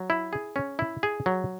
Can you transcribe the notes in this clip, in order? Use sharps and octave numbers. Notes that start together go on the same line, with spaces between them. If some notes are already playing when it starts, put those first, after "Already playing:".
Already playing: F#3
E4
G#4
C#4
E4
G#4
F#3